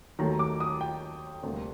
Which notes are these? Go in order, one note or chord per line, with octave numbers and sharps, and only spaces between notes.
D#2 D#3 F#3 A3 A#5
D6
D#6
G5
D2 C3 G3 A#3